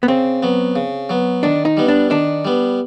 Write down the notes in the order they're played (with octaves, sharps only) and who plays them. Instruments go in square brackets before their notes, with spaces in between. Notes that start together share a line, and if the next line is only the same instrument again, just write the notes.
[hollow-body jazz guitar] B3
[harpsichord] C#3 [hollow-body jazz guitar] C4
[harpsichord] F#3 B3
C#3
F#3 B3
[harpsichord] D#3 [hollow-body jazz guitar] D4
[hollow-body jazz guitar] D#4
[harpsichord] G3 B3
[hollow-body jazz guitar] D4
[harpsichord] D#3 [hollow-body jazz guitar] D4
[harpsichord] G3 B3